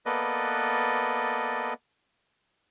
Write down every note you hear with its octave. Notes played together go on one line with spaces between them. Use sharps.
A#3 B3 A4 B4 D5 D#5